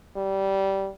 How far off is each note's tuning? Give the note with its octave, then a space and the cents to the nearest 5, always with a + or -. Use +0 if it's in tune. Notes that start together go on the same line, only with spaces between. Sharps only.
G3 -15